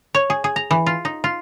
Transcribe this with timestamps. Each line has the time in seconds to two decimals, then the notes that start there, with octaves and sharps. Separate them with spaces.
0.15 C#5
0.30 G#4
0.44 G#4
0.56 A#5
0.71 E3
0.86 F4
1.05 D#4
1.24 F4